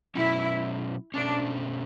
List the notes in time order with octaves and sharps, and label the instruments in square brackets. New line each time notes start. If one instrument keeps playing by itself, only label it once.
[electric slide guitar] B2 F#3 C#4 [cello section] E4
[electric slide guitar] B2 A3 C#4 [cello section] D4